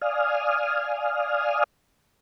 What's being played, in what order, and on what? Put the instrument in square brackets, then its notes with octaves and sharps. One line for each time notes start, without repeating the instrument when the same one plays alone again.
[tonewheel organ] D5 F5 G#5 D#6 F6